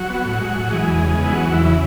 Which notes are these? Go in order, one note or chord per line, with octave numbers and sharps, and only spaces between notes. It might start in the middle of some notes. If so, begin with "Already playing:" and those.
Already playing: F#3 F#4
B3
A2
G#3
A2
E3 G#3 G#4
E2
C#3
B3
E4
E3 F#3 F#4
E2
E3 E4
C#3 E4